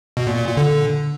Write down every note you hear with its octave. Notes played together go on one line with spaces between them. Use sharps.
B2
A#2
A#2
A#2
D3